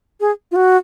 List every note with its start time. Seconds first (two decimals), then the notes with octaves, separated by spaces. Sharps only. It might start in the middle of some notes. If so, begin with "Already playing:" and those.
0.20 G#4
0.51 F4
0.56 F#4